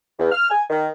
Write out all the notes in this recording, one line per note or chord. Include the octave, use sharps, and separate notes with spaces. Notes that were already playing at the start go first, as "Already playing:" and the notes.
E2
F6
G#5
D#3